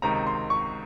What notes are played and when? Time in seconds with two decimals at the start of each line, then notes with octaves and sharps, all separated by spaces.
0.02 C#2 C3 D#3 A#5
0.27 C6
0.50 C#6